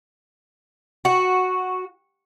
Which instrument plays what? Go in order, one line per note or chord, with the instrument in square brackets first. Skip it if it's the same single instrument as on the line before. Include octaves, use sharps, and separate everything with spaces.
[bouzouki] F#4